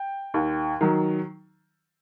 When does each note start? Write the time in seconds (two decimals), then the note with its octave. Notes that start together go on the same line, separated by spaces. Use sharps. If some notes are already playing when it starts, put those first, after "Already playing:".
Already playing: G5
0.34 D#2
0.81 D#3 F#3